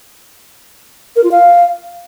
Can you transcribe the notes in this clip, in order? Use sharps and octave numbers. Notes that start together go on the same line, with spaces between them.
A#4
F4
F5